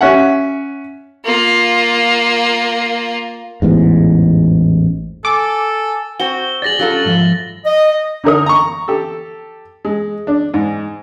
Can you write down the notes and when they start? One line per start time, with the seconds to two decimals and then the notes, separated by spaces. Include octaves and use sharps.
0.01 C#4 E5 F#5
1.25 A#3 F4
3.62 A1 E2 G#2
5.25 A4 G#5 D6
6.20 C4 F#4 G7
6.62 G#4 D5 A6 A#6 F#7
6.79 F#3 C#4 F4 G4 A4
7.05 G#2 F3 E5
7.65 D#5
8.24 D3 D#4 A#4 D#6
8.46 A#5 C#6
8.88 G4 A4
9.85 G#3
10.27 D4
10.54 G#2